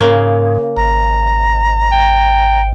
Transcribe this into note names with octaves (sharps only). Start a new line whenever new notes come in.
G#2 C#3 A#3
G#1 A#5
G5